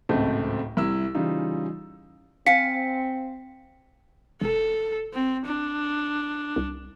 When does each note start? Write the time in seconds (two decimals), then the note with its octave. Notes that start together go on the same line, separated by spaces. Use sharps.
0.09 D1 G#1 C#2 A3 C4 A5
0.77 C2 E4 E6
1.15 C#3 E3 G3 D#4 F4
2.46 C4 F5 G#5 B6 C#7
4.41 E1 A4
5.13 C4
5.46 D4
6.56 C2